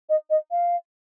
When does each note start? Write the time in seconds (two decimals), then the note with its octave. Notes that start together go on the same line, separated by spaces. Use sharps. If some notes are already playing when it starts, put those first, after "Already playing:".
0.09 D#5
0.30 D#5
0.51 F5